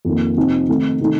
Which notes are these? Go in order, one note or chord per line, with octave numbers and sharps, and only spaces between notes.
F2 D#3 A#3
C3 F3 C4 D#4
C3 D#3 A3 C4 D#4
C3 D#3 A3 D#4